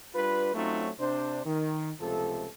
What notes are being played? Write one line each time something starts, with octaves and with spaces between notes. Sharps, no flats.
G3 D4 F4 B4
F#3 A3 C4 C#4 D#4 F4
C3 D4 C5
D#3
C#2 C3 F3 A3 A4